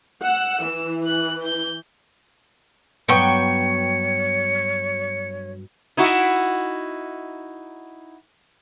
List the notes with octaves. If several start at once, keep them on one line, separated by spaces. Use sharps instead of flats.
F#5 E6
E3
F#6
G6
G2 F#3 B3 C#5 G5 C#6 C#7
D#4 E4 F#4